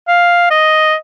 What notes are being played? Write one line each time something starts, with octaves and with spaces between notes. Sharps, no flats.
F5
D#5